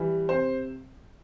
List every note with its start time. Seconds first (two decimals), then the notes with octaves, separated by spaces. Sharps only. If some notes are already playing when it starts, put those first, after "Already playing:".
Already playing: E3 G3
0.29 C3 C5